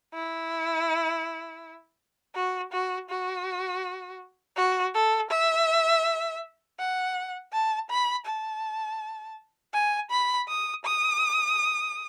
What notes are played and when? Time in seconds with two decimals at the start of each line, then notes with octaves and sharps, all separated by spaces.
0.14 E4
2.35 F#4
2.72 F#4
3.09 F#4
4.57 F#4
4.94 A4
5.30 E5
6.79 F#5
7.53 A5
7.90 B5
8.26 A5
9.74 G#5
10.10 B5
10.48 D#6
10.85 D#6